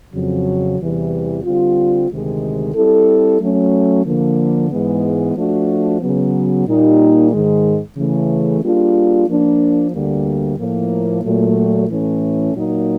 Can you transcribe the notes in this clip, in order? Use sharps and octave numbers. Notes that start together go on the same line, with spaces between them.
F2 C#3 F#3
E2 C3 E3 G3
D3 G3 C4 F4
D2 C3 D#3 G#3
G3 C4 E4 A4
F#3 A3 C#4
D3 F3 A#3
G#2 E3 G#3 B3
F3 A3 D4 F#4
C#3 F#3 B3
A#2 G3 A#3 D#4 G4
G#2 D#3 G#3
C#3 E3 A3
G3 A#3 D4 F4 G#4
F3 A#3 D4
D2 D3 G3 A#3
A2 F3 A#3
A#2 F#3 A3
A2 E3 A3 C#4
A#2 F#3 A#3 D#4